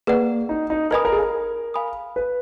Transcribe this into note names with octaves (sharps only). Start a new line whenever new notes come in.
A#3 G#4 B4 D5 F#5
D#4
D#4
A#4 B4 D#5 G#5 B5 D#6
A#4
G#4
A#4
F5 G#5 B5 D#6
B4